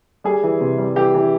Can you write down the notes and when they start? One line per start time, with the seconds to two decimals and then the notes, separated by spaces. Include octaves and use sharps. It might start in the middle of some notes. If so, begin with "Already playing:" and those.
0.24 G3 G#4
0.43 E3
0.61 C3
0.78 G3
0.96 E3 G4
1.14 E3